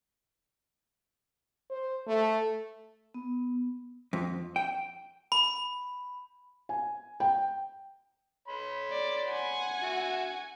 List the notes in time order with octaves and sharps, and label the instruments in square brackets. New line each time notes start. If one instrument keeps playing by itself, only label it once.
[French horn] C5
A3
[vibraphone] B3
[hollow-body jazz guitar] F2
G5
[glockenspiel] B5
[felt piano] G#5
G5
[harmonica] C#5 B5 C6
[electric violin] D5
F#5 G#5
[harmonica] F#4 E5